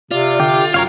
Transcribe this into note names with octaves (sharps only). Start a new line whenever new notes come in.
C3 F4 D5
D3 G4
F#2 A#4 C#5 F5